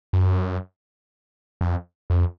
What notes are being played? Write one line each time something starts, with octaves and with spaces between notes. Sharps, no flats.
F#2
F2
F2